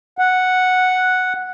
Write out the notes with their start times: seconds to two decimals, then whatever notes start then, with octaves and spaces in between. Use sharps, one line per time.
0.18 F#5